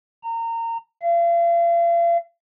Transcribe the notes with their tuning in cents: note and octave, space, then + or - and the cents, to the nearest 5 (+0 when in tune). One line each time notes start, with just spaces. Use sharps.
A#5 -25
F5 -40